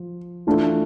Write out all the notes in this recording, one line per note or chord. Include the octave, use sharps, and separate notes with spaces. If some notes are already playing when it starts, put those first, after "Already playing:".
Already playing: F3
E3 A3 D4 F4 A4